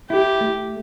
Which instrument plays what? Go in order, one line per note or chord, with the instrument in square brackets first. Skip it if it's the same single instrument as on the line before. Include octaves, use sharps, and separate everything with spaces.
[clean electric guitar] E4 [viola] G4
[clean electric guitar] A3